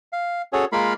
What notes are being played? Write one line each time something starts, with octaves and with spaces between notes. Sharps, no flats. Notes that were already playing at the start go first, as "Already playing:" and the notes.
F5
C#4 F#4 G#4 A4 C#5
G#3 A#3 F4 A#4 F5 B5